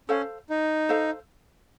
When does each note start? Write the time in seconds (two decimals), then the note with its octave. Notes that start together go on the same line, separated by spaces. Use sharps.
0.09 C#4 A4 C5 F5
0.50 D#4
0.89 A4 C5 F5